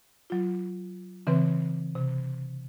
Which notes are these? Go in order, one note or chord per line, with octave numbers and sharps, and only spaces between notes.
F#3 F4
C#3 E3 C4 B4
C3